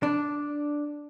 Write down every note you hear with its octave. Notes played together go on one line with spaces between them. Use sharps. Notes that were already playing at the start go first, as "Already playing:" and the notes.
D4